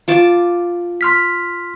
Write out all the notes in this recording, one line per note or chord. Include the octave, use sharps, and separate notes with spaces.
F4 A5 D6
C6 F6 B6